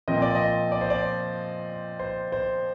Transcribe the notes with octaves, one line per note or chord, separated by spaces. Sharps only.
A#2 F3 C4 D#5
D5
D#5
D5
C5
D5
C5
C5